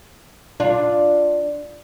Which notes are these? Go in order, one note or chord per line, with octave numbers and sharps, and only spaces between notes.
D4 F4